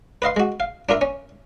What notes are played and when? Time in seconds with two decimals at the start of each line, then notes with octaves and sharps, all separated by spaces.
0.22 B4 D#5 F5 C6
0.36 G#3 F#4
0.60 F5
0.89 D4 F4 A#4 E5
1.01 C#4